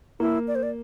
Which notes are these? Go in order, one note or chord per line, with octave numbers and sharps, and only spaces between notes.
A#3 E4
D5
C5
D5